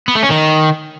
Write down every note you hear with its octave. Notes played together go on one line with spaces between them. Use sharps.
B3
A3
C#4
D#3